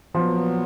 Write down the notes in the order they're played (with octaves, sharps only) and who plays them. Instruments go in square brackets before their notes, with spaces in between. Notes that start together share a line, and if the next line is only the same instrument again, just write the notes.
[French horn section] A#2 F#3 B3 [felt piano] F3